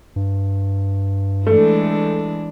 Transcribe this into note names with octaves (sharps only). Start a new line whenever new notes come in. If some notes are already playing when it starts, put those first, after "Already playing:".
G2
E3 G#3 A3 D4